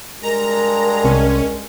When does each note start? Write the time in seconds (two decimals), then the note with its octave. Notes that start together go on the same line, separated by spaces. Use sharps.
0.23 G2 G#3 A#4 A#5
1.04 C2 C#4